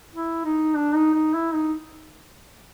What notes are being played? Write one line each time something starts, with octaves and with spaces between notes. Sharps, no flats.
E4
D#4
D4
D#4
D#4
E4
D#4